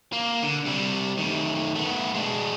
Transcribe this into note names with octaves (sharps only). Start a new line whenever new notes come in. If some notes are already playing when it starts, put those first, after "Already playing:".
A#3
D3
C3 G3
D#3 A3
A3 B3
G#3 D4